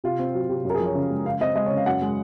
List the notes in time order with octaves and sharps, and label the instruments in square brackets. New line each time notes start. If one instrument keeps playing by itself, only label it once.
[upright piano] C3 F4
C4
F#3
C3
F#2
A#4
G#4
F3
C#5
C#3
G#3
C#3 F5
C4 D#5
G#3 D#5
C#5
C#3
F5
F#2 F#5
G#3